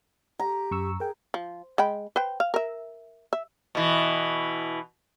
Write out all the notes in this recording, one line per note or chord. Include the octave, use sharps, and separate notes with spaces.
G4 A#5
F#2 C#6 E6
G#4 A#4 G5
F3
G#3 G5 B5
B4 C5 G5
F5
A#4 E5
E5
B2 E3